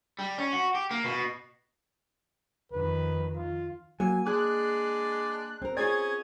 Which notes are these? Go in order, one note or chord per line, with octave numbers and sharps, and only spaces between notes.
G3
C#4
F#4
G4
A#3
B2
F2 D#3 B4
F4
F#3 A#3 G#5
G#3 D4 G#4 D5 F#6
C4 A#4
C#4 F4 G#4 D5 D#6 G#6